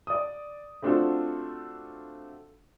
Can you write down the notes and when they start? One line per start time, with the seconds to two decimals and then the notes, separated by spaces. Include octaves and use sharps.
0.07 D5 D#6
0.82 A3 C4 D4 F4 F#4 A4